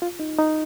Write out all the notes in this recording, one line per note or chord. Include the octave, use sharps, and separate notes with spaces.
F4
D#4
D#4